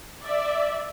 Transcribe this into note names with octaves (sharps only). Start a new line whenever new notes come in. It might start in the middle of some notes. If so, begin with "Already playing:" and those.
D5 E5